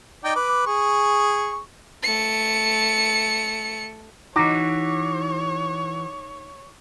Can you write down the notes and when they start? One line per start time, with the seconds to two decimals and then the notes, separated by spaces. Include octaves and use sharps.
0.24 D#4 D5 G5
0.35 B4 D6
0.66 G#4 C#6
2.03 A3 C#7
4.36 E3 D#4 F#4 C#5 D6